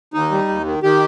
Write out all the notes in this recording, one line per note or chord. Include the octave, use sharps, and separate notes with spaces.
D#2 D#4
G3
D#2
D#3
D#3 G4